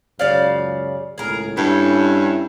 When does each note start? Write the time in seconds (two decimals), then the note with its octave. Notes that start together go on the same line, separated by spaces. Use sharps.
0.19 C#2 F#2 C#3 D5 F5
1.18 G#1 C#2 A2 G#4 A#4
1.57 G2 C#4 E4 A4